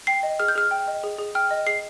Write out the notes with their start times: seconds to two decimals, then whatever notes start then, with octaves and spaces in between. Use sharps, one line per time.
0.07 G5 C7
0.23 D#5
0.40 G#4 F6
0.48 G6
0.55 G#4 F6
0.71 G5
0.87 D#5
1.03 G#4
1.18 G#4
1.35 G5 F6
1.51 D#5
1.66 G#4 C7